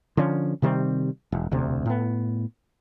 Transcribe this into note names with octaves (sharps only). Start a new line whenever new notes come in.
D3 F3 C#4
C3 D#3 G3 C4
E1
E1 D2 C3
A2 B3